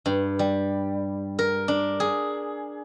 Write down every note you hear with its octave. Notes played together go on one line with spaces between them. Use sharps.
G2
G3
A#4
D4
G#4